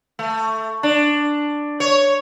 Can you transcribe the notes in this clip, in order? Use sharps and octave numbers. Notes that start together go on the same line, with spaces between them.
A3
D4
C#5